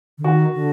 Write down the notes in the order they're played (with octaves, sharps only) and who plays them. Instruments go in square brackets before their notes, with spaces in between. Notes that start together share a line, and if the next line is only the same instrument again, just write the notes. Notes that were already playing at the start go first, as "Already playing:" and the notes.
[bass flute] D3
[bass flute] D#3 [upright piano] F#4
[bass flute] D3